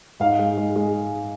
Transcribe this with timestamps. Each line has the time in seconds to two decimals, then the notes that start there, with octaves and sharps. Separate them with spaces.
0.20 G#2 F5
0.39 G#3
0.58 G#3
0.76 G#3